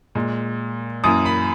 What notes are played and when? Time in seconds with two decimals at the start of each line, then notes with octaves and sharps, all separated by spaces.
0.15 A#2 G#3
1.04 F#2 E3 A#3 D#6
1.26 B5